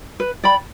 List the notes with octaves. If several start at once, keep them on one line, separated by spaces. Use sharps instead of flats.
B4
D5 G5 B5